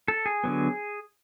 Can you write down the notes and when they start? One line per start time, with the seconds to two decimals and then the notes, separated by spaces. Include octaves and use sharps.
0.08 A4
0.26 G#4
0.44 D3 F#3 B3